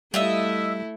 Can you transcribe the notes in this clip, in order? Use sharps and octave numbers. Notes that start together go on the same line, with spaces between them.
G3 A3 E4 F4 D#5 E5